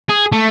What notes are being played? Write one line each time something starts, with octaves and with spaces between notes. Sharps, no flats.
G#4
A3